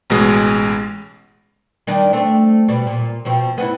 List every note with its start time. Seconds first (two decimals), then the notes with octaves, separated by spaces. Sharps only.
0.10 A1 B2 G#3
1.87 D#3 G3 D4
2.13 A3 C4 D4
2.68 B2 G3
2.87 A#2
3.25 B2 F3 C4
3.58 B3 C#4 E4